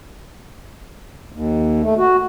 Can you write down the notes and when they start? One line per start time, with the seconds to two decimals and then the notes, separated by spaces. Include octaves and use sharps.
1.32 D#2
1.82 A3
1.98 F#4